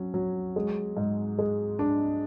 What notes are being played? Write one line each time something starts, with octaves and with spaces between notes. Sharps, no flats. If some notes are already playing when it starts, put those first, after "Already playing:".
Already playing: F#3 C#4
F#3
G#3
G#2
G#3
D4